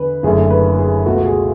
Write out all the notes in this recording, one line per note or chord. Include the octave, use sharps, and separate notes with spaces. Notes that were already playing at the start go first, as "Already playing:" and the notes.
Already playing: E2 D3 B4
F#1 F#2 D3 A3 G#4
B4
G#4
C#2 B2 A3 F#4
G#4